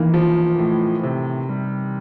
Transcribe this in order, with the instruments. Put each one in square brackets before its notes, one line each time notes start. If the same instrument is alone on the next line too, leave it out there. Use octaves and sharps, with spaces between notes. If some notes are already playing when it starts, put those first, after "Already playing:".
Already playing: [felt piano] D#3 E3 [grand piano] A#3
[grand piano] F3
A2
C3
G3